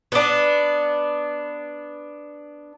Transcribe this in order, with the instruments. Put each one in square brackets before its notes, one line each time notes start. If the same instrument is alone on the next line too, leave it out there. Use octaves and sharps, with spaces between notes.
[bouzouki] B3 D4